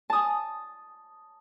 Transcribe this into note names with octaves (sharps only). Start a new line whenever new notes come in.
A5 D#6